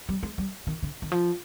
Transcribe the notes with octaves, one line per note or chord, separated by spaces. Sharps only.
G3
G#3
G3
D#3
D3
D#3
F3